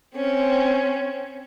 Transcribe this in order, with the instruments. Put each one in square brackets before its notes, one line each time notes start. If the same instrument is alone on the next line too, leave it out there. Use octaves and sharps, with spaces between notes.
[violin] C4 C#4